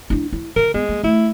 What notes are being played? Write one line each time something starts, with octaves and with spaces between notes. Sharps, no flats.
D4 E4
E4
D3 A#4
G#3 B3
A#3
A3 E4